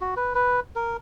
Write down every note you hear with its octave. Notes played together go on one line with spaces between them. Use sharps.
F#4
B4
B4
A#4